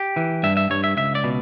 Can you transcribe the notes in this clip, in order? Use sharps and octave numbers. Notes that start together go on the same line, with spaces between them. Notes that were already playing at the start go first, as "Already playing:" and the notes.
Already playing: G4
E3
G2 E5
E5
G2 C#5
E5
C#2 E5
D5
B2